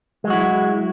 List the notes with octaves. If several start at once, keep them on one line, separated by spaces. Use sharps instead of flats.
F#3 G#3 E4 F#4